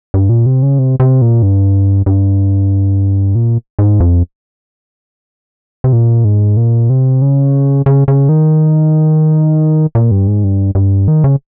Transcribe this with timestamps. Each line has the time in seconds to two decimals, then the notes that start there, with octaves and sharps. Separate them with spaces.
0.14 G2
0.29 A#2
0.46 C3
0.63 C#3
0.79 C3
1.00 C3
1.22 A#2
1.43 G2
2.06 G2
3.35 A#2
3.79 G#2
4.00 F2
5.84 C3
5.93 A#2
6.25 G#2
6.57 A#2
6.90 C3
7.22 C#3
7.86 C#3
8.08 C#3
8.29 D#3
9.95 A#2
10.11 G2
10.27 G#2
10.44 G2
10.75 G2
11.08 D#3
11.24 C#3